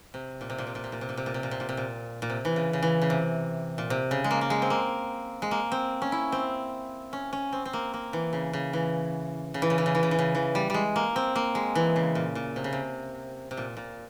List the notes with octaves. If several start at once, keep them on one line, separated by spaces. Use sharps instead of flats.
C3
A#2
C3
A#2
C3
A#2
C3
A#2
C3
A#2
C3
A#2
C3
A#2
C3
A#2
C3
A#2
A#2
C3
E3
C#3
C#3
E3
C#3
C3
A#2
C3
C#3
G#3
A#3
A#3
G#3
C4
A#3
G#3
A#3
C4
C#4
E4
C4
C#4
C#4
C4
C4
A#3
A#3
E3
C#3
C#3
E3
C#3
E3
C#3
E3
C#3
E3
C#3
E3
C#3
E3
G3
G3 G#3
A#3
C4
A#3
G#3
E3
C#3
A#2
A#2
C3
C#3
C3
C3
A#2
A#2